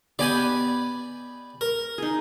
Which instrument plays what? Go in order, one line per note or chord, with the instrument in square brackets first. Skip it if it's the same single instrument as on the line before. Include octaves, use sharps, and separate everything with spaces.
[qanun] B3 G4 D#5 [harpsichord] D5 G#5 B5
[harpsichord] A#4
[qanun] D#4 G#4